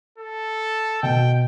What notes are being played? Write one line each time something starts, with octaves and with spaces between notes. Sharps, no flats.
A4
B2 G5